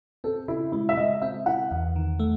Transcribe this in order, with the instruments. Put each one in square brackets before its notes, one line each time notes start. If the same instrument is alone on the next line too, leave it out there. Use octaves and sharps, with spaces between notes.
[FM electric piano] C4 [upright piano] A4
[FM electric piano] C#3 [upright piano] E4
[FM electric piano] G#3 [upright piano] E4
[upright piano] E5
[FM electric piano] G#3 [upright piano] D#5
[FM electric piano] C4 [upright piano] E5
[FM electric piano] E4 [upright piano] F#5
[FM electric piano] E2
D#3
A3